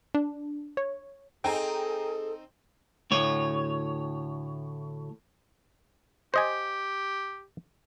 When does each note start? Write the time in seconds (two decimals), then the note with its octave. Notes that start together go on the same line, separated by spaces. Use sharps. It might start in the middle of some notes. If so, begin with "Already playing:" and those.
0.15 D4
0.77 C#5
1.44 C4 D#4 G#4 A4 G5 G#5 A#5
3.11 D2 A2 C#5
6.34 G4 C5 D#5 G#5